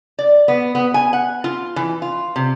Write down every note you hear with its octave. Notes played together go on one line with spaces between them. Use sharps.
D5
B3
B3
G#5
F#5
F4
E3
F4
C3